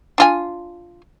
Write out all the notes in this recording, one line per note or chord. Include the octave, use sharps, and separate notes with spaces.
D4 F4 G#5